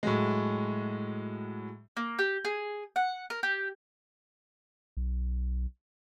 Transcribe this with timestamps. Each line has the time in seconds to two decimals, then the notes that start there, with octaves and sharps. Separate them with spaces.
0.03 A2 F#3 G#3
1.97 A#3
2.19 G4
2.45 G#4
2.96 F#5
3.30 A#4
3.43 G4
4.97 B1